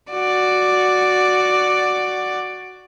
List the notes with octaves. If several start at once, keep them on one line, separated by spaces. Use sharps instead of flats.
F#4 D5